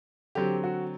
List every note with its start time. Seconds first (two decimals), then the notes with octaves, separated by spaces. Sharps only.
0.35 D3 F#3 C4 G4
0.64 F#4